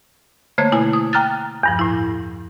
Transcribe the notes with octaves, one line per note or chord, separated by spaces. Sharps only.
D3 A3 A#3 C5 C#5 G#6
B2 E4 G#5
D#6
G5 A#5 F6 F#6 A6
E2 G2 F3
A2 E4